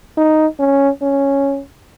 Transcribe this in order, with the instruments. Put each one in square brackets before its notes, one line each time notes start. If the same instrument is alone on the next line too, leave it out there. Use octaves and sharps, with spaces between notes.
[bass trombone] D#4
C#4
C#4